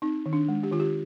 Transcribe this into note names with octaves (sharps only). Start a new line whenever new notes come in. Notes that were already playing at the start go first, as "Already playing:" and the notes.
C4 D#4
D#3
D4
G#3
G4
D#3 F4
G4